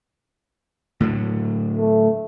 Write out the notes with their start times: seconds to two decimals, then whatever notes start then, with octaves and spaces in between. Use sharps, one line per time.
1.00 A2 D3 F#3
1.77 A3